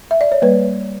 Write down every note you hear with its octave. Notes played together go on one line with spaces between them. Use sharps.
E5
D5
C#5
G3 A#3 B4